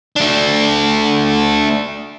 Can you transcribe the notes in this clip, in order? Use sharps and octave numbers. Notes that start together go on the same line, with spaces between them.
A3 D4